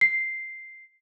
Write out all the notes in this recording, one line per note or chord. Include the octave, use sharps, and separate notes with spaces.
C7